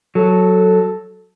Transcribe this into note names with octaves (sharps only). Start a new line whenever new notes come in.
F#3 A4